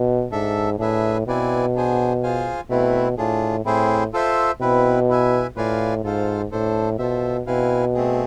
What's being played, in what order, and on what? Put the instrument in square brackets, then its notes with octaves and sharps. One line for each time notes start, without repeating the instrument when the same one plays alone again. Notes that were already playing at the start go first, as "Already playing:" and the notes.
Already playing: [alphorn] B2
[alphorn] G#2 [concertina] D4 A4 E5
[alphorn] A2 [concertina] D4 G#4 B4 E5 G#5
[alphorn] B2 [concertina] C4 E4 B4 D5 G#5
[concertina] B3 D4 G#4 C5 G#5
F4 G#4 C5 F5 G#5
[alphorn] B2 [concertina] A3 C4 E4 B4
[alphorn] A2 [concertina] D4 F4 G#4
[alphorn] A2 [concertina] C4 E4 G#4 C5
[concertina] F4 A4 C5 E5
[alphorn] B2 [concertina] C4 E4 B4
[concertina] E4 B4 E5 G#5
[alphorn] A2 [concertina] F4 B4 D5 F5 G#5
[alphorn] G#2 [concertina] F4 A4 C5 F5
[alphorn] A2 [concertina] D4 A4 C5
[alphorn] B2 [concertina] F4 A4 C5 E5
[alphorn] B2 [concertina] C4 E4 B4 F5 G#5
[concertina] A3 C4 G#4